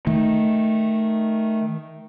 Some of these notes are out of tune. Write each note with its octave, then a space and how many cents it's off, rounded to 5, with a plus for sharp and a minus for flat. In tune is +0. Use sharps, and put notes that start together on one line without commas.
D#3 +0 A3 +0